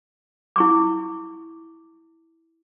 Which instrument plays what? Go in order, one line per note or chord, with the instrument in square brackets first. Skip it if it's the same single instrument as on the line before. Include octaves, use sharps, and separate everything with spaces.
[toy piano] E4 C#6 D6